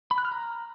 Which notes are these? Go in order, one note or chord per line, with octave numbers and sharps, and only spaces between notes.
B5
F#6
F6
A#5